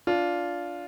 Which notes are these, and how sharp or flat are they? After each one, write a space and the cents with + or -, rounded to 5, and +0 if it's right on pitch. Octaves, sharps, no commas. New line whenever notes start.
D4 -20 F4 +0